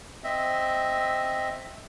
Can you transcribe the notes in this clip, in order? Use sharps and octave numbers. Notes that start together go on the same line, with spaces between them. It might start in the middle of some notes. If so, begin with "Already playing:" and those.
C4 D#5 E5